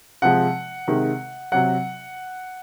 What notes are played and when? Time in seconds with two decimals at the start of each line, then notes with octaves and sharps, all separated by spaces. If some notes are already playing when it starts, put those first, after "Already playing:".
0.22 C3 F3 G#3 F#5
0.88 C3 D#3 G#3
1.52 C3 F#3 F#5